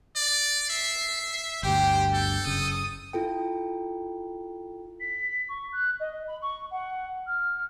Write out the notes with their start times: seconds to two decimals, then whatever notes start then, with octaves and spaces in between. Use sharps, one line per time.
0.16 D5
0.70 E5 C7
1.63 G1 D2 G4 C5
2.14 A4 G6
2.47 F#1 C#3 D#6
3.13 E4 F4 A4 G5
5.00 B6
5.48 C#6
5.72 F#6
6.00 D#5
6.27 B5
6.42 C#6
6.71 F#5
7.26 F6